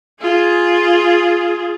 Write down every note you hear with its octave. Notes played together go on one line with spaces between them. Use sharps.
F4 G#4